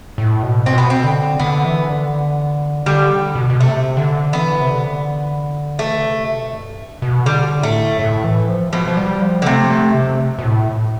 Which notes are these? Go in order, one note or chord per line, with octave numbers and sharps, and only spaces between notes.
A2
B2
B2 C4
B3
C4
D3
D3 B3
E3
D3
D3 G3
B2
B2
C3 A3
D3
E3 B3
C3
D3
E3 A3
D3
C3
B2
G2
B2
D3 G3
A2 A3
A2
E3
F3
B2 F3
F3
G3
F3
D3
C3 A3
A3
C3
B2
A2